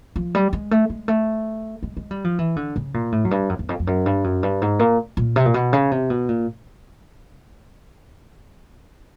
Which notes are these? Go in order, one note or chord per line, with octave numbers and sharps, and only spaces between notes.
F3
G3
G#3
A3
G#3
A3
G#3
G#3
G3
F3
E3
D3
C#3
A#2
A2
F#2
G2
F#2
E2
F2
F2
F#2
G2
F#2
G2
G#2
A#2
A#2
C3
A#2
B2
C#3
C3
B2
A#2